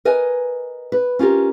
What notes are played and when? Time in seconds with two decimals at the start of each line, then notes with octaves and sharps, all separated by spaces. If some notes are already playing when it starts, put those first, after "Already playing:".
0.05 A#4 B4 D#5 G#5
0.92 B4
1.19 C#4 F4 G4 A#4